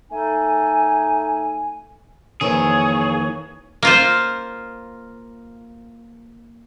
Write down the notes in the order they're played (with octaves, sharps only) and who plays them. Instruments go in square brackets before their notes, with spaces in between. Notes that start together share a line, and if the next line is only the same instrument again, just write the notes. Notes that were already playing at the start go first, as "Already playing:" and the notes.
[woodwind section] A3 D#4 A4 G#5
[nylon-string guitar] F2 D#3 E3 [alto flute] A#3 [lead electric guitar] G#4 [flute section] C#5 C#6
[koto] A#3 F4 C5